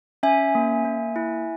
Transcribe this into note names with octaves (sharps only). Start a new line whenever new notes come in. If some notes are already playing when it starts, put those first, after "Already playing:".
C#4 E5 G#5
A#3
A#3
E4